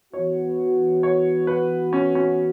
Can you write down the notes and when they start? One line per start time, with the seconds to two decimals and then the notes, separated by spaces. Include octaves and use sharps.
0.13 E3 B3 F#4 C#5
1.03 C#5
1.47 B4
1.93 C#4
2.15 C#4